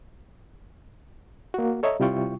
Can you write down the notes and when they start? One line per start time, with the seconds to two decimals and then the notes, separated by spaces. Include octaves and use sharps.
1.54 A#3 F#4
1.83 A4 C#5 D#5 E5 A#5
2.00 C3 G3 E4 F4 G5 C#6